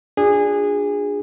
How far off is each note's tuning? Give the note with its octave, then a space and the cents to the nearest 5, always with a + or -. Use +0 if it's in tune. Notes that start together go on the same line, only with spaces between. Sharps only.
D4 +0 F4 +40 G#4 -20